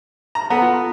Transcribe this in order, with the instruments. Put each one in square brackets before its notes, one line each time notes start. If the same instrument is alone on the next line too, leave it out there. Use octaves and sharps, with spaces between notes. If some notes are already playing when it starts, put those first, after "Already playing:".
[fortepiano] A#5
[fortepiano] B3 [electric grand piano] A4 F#5 A#5
[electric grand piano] F4